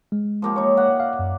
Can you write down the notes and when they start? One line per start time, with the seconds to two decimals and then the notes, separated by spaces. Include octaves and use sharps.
0.12 G#3
0.42 F3 A#3 G4
0.56 D#4 C#5
0.77 D5 E5 F#5
1.00 F5
1.19 F#2